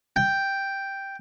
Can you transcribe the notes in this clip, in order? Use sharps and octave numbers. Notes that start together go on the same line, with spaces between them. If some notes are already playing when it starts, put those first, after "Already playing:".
G5